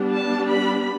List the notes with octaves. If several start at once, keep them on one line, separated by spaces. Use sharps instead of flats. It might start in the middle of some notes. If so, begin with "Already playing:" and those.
Already playing: G3 B3 D4
A5
B5